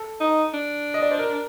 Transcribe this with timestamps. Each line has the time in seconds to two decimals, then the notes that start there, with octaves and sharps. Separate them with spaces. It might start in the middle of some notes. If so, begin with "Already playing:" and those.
Already playing: A4
0.20 D#4
0.54 D4
0.94 D#5
1.02 D5
1.11 C5
1.19 A#4